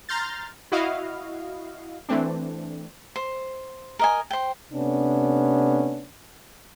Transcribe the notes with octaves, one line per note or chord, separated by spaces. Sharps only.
A#5 C6 F6 G6 A6
E4 F#4 D#5 F5
E3 A3 C4 D4
C5
A#4 D#5 G#5
C5 G5
C3 A3 B3 C#4 D4